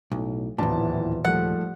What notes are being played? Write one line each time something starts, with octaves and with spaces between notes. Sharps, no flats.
B1 A2
D1 D#2 A#2 E3 B3 A5
G#2 F3 G3 A3 F#5